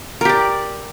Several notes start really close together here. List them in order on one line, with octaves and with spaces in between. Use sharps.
A#4 G4 D5